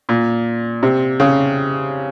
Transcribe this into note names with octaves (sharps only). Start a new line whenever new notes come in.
A#2
C3
C#3